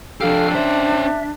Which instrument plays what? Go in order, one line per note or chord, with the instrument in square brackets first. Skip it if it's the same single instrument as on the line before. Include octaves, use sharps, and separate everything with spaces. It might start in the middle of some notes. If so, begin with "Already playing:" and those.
[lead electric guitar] F3 G4 [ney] D4 [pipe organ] A4 F5 F6
[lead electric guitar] C#4 C5 [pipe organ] E5